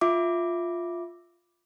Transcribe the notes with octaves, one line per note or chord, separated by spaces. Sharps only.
F4 E5 D6